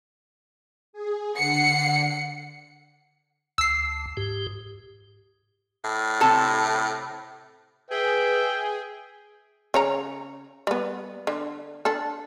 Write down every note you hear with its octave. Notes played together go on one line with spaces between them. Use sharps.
G#4
D3 F#5 C7 C#7
D2 E6 C7
G#2 G4
A2
C3 A4 A5
G#4 B4 E5 G5
C#3 C#5 A#5
G3 B3
D3
D4 A4